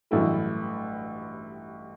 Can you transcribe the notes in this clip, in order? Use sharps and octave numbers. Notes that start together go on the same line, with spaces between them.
A1 G2 F#3 A3 E4